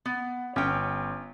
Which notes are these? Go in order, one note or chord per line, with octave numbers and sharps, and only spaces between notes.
B3
G1 C#4 G5